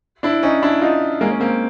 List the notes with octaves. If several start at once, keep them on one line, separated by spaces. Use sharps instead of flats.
D4 E4
C#4 D#4
D4 E4
D#4 F4
G#3 A#3
C#4
A#3 C4